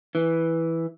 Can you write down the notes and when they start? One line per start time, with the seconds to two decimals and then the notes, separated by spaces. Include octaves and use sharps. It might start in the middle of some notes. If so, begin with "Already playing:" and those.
0.15 E3